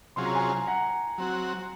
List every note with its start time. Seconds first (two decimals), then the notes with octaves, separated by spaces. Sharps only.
0.16 C3 F#3 C#4 F4 G#4 C6
0.25 A#5
0.34 G#5 C6
0.67 F#5 A#5
1.18 F#3 C4 F#4